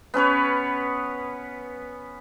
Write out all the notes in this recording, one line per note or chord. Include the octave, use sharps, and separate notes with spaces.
B3 C#4 B4 C#5